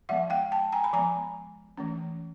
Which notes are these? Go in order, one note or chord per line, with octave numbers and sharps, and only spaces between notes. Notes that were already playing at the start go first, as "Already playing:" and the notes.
F3 G#3 B3 E5 F#5
F5 G5
G5 A5
G#5 A#5
B5
F3 G#3 B3 G#5 A#5
E3 A3 C#4